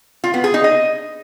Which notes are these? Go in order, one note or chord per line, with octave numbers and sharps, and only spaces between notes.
F4
B3
G#4
D#4
D#5